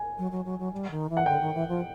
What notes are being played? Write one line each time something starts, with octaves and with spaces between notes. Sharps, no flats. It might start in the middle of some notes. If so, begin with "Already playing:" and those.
Already playing: G#5
F#3
F#3
F#3
F#3
G3
D#3
E3
F#5
D3 G5
D#3
E3
F3